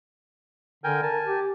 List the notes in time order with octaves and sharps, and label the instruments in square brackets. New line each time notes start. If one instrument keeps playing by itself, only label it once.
[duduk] D3 [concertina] A#4 G5 G#5
[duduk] A#4 [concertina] G#5 A5
[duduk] G4